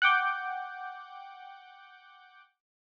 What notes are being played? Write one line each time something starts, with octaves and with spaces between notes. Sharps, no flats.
F#5 G5 D6 G6